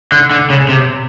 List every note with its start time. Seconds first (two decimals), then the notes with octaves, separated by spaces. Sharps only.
0.12 D3
0.31 D3
0.50 C#3
0.69 C3